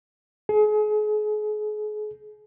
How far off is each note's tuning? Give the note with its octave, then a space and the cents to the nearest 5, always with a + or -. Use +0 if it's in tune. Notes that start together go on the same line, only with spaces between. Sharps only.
G#4 +35